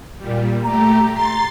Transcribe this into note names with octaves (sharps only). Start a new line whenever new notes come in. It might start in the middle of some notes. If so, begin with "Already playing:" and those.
A#2 G3
A3 G4 A#5
C6 A6